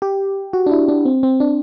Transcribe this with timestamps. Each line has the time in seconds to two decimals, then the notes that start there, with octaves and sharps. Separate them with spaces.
0.02 G4
0.53 F#4
0.66 D4
0.71 E4
0.88 D4
1.05 C4
1.23 C4
1.40 D4